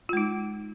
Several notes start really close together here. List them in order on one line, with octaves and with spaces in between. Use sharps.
F4 G#3 D#4